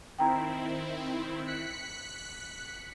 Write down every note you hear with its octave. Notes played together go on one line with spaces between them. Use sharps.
D#3 C4 E4 G5 A#5
F#6 B6 C#7